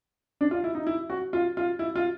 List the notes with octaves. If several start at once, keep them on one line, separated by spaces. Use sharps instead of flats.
D4
F4
E4
D#4
E4
F#4
F4
F4
E4
F4